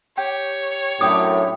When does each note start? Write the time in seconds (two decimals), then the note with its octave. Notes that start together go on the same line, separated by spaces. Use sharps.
0.17 G4 C#5
1.01 F#2 A2 D4 G4 D#6